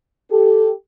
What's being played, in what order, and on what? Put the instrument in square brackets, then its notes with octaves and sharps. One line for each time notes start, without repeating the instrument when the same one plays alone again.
[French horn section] G4 A4